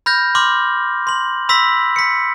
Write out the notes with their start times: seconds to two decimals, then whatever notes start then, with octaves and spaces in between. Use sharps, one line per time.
0.06 B5 F6 G6 A#6
0.35 B5 C6 D6 F6
1.07 C6 F#7
1.49 B5 C6 E6 A#6 B6
1.96 B6 C#7